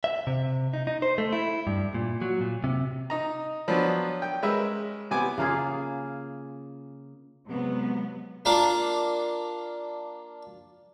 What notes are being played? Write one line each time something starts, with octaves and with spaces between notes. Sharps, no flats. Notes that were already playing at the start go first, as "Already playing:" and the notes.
E5
C3
D#4
D#4
C5
A3
E4
G2
A#2
F#3
A#2
C3
D#4 A#5
F3 F#3 B3 C#4 D4
G5
G#3 C#4 A#4 B4 E5
C3 B3 G#5 D6
C#3 A#3 F4 G#4
C3 F#3 G#3 B3
A#3 D4 F4 A#4 D6